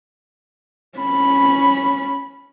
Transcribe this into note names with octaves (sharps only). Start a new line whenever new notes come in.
C#4 B5